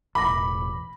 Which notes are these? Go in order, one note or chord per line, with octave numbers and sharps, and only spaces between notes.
E1 A1 B5 D6 A#6